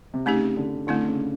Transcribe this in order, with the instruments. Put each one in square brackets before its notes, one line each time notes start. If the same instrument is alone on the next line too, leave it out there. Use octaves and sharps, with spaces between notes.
[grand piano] C3
[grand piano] C#3 [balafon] A3 C4 D#4 G4
[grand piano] D3
[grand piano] D3 [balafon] A3 C4 E4
[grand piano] C#3